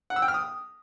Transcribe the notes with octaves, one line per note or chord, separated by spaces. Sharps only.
F#5
E6
G5
F6
D#6